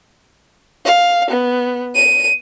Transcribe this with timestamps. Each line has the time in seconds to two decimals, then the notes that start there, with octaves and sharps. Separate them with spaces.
0.86 F5
1.31 B3
1.95 D#7